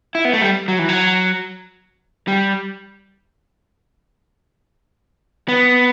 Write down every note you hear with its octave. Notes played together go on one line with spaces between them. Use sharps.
E4
B3
A3
G3
F#3
E3
F#3
G3
B3